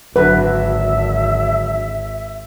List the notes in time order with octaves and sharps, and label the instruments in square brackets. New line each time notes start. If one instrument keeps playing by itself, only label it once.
[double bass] G#1 [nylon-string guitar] D3 F#3 [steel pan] B4 [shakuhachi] E5